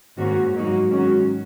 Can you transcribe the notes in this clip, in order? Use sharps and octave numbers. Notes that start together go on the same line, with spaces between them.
G#2 D#3 A#3 C#4 F#4
G#2 F#3 A#3 D#4 F#4
G#2 D#3 F#3 C#4 F#4